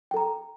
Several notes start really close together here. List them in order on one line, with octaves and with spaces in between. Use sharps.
G5 A4 A#5